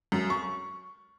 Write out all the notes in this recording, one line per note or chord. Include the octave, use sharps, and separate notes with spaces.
F#2
C#6